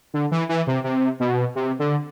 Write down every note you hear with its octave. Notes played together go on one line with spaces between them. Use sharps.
D3
E3
E3
C3
C3
B2
C3
D3